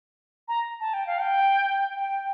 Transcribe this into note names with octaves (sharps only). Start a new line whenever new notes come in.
A#5
A5
G5
F5
G5
G5